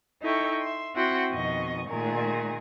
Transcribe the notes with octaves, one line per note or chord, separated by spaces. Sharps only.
D#4 E4 A4 G5 C#6
E5 C6
C4 E4 F#4 F#5 G5 C6
F2 B2 D#3 D#5 C#6
A#2 D#3 A3 G#4 A#4